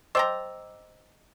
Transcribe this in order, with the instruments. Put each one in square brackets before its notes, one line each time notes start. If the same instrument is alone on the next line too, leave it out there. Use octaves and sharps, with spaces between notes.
[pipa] C5 G5 A#5 [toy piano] D#5 D6 E6